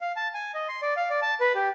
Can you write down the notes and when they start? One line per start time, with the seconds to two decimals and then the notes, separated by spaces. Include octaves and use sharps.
0.01 F5
0.16 A5
0.34 G#5
0.54 D#5
0.68 C6
0.82 D5
0.97 F5
1.10 D5
1.22 A5
1.41 B4
1.55 G4